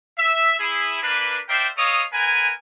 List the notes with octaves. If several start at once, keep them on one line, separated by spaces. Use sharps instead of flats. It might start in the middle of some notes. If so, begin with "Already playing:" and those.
E5
E4 G#4
A#3 D4 A#4 B4
A#4 C5 D5 E5 F5 G5
A4 C#5 D#5 F5 D#6
B3 A#4 B4 G#5